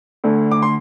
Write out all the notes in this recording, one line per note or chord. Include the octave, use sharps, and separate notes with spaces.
D2 D3 A3
D6
C6